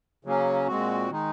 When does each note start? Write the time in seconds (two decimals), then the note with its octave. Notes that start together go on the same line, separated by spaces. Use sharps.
0.25 C#3 F#3 A#3 C#4
0.68 A#2 G#3 C4 F#4
1.11 D#3 G#3 D#4